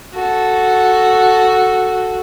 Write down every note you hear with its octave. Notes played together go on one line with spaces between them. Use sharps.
F#4 A4